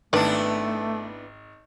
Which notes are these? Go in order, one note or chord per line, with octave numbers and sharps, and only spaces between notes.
G#1 A3 B3 D4 E4 B4 D5